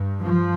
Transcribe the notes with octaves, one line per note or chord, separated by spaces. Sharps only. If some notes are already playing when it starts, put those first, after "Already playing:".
Already playing: G2
F3